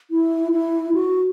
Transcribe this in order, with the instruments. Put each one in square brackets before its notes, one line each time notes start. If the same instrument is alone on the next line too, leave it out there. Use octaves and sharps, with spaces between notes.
[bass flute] E4
E4
F#4